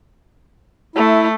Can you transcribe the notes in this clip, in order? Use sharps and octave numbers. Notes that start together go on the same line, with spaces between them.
A3 E4